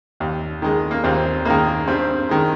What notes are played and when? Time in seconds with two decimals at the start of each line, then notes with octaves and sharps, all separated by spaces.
0.20 D#2
0.62 D#3 G#3
0.91 A#3
1.04 D#2 C4
1.45 D#3 G#3 A#3
1.87 G2 C4
2.29 D#3 G#3